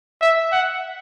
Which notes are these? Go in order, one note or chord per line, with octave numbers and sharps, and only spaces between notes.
E5
F#5